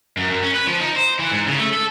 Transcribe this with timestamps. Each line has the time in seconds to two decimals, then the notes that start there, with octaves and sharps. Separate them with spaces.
0.17 F#2
0.30 F#2
0.43 C#4
0.54 B4
0.67 F3
0.81 D#4
0.96 C5
1.19 E3
1.32 G#2
1.46 C#3
1.59 A3
1.73 A4